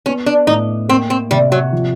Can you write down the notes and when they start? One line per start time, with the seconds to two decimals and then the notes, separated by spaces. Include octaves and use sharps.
0.06 B3 C#4
0.26 D4
0.47 A2 D#4
0.89 A#3 C4
1.10 C4
1.31 C3 G3
1.52 F#3
1.72 F3